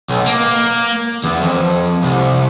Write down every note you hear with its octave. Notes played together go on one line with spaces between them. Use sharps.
B1
A#3
E2
F2
C2